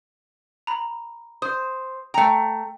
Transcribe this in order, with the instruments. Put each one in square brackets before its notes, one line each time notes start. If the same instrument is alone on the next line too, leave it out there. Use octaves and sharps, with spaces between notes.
[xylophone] A#5 B5
[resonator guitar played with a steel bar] C5 [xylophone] D#6
[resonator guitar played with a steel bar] A3 A#5 [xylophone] G5